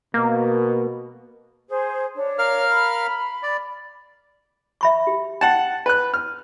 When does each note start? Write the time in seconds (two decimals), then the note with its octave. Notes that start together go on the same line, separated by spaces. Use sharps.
0.14 B2 A#3
1.69 G#4 C5
2.16 D4 C#5
2.39 A#4 F5 F6
2.71 B5
3.43 D5
4.81 E5 B5 C#6
5.07 G4
5.41 F#5 G5 A5
5.86 B4 F#6
6.14 F6